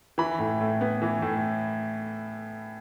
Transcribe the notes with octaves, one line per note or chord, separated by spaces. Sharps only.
E3 B5
A2
A2
B3
E3
A2